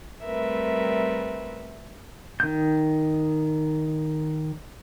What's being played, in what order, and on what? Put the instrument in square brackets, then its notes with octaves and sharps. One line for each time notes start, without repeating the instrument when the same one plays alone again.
[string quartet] G3 A3 C4 A#4 B4 E5
[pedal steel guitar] D#3 G6